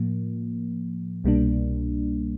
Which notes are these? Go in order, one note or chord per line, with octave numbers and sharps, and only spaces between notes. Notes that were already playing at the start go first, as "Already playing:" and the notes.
Already playing: A2 F3 A#3
C2 B2 G3 A#3 D4